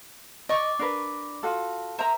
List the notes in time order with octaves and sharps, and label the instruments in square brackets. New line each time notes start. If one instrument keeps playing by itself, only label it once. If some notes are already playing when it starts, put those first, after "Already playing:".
[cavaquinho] D5 C#6 [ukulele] D#5
[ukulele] D4 A#4 B4
F4 F#4 A4
[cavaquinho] A#4 E5 [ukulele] C5 A#5